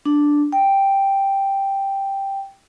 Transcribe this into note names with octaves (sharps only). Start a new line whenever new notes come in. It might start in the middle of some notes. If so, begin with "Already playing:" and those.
D4
G5